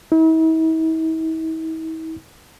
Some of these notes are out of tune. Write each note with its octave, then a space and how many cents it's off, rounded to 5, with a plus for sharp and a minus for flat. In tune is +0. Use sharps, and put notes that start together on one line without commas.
E4 -45